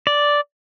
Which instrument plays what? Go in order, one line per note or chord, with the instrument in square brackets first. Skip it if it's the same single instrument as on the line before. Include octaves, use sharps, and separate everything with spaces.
[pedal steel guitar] D5